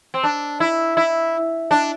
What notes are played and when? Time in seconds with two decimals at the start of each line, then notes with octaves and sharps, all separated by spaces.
0.14 C4
0.24 D4
0.60 E4
0.97 E4
1.71 D4